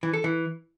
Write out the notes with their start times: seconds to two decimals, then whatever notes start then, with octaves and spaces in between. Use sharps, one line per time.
0.03 E3
0.13 A4
0.24 E3